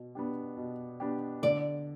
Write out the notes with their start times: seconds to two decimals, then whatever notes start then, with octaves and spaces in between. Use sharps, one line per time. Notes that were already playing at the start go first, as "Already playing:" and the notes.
Already playing: B2
0.15 B3 D4 G4
0.57 B2
1.00 B3 D4 G4
1.42 D3 D5